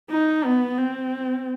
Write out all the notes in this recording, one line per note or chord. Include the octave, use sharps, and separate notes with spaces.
D#4
B3
C4